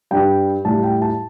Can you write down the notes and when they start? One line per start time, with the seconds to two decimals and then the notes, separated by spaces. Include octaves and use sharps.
0.11 G2 G3 G5
0.65 A2 G3 A5
0.83 G5
1.02 A5